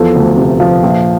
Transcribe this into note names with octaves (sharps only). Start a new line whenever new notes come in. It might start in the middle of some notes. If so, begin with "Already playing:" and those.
Already playing: E2 F3 A4
D2
C3
F3
A#1